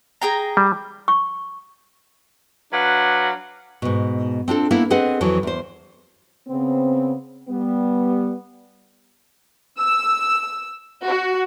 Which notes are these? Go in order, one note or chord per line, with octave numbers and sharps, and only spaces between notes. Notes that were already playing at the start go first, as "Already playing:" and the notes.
G#4 G5 A#5
G3
C#6
F#3 D4 B4 F5 F#5
G#2 B2
C4 D4 F4 A4
A#3 B3 E4 A4
C4 G#4 B4 D#5 F#5
F2 E3 F#3
E2 C5
C#3 B3 C4
G3 B3
E6
F#4